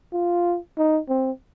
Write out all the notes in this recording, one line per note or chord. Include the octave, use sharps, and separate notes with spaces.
F4
D#4
C4